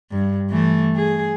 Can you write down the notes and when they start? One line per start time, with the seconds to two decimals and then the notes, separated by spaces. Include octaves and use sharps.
0.11 G2
0.50 E3 A3
0.96 G#4